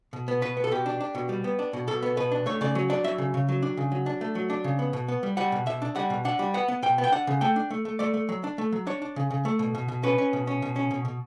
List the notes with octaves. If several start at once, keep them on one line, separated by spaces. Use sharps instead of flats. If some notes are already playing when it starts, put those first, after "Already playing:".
B2
B3
B2 B4
B3
A4
B2 G4
D4
D4
B2
G3
B3
D4
B2
B2 A4
B3
B2 B4
D4
A3 C#5
C#3 D5
F#3
D4 D5
F#3 E5
C#3
C#3
F#3
D4
C#3
F#3
D4
A3
F#3
D4
C#3
B3
B2
B3
G3
G3 F#5
B2
B2 E5
D4
G3 F#5
B2
D4 F#5
G3
B3 F#5
B3
B2 G5
B3
G5
D4 F#5
C#3
A3 G5
D4
A3
A3
A3 D5
A3
F#3
D4
A3
F#3
D4 C#5
D4
C#3
C#3
A3
B2
B2
B2
C#4 B4
C#4
B2
C#4
B2
C#4
B2
B2